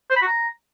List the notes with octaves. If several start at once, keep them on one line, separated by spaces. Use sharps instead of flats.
C5
B5
F#4
A#5